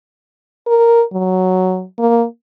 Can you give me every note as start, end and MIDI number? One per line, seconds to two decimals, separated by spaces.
0.67 1.03 70
1.13 1.84 54
1.99 2.24 58